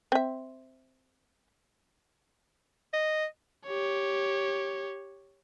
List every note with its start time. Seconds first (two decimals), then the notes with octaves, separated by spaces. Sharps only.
0.12 C4 E5
2.94 D#5
3.66 G4 C#5